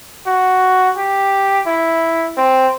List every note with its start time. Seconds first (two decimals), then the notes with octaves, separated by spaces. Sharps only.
0.26 F#4
0.97 G4
1.67 E4
2.37 C4